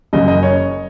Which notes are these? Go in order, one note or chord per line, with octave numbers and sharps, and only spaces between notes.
F#1 F#2 C#3 D#5
D#5
C#5